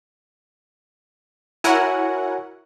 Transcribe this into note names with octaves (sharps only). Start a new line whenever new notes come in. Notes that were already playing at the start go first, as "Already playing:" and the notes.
E4 F#4 A#4 C#5 F#5 G#5